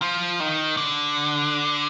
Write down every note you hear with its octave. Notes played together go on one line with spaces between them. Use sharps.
F3
D#3
D3